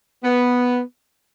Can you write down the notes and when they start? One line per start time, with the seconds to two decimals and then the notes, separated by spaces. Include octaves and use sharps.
0.24 B3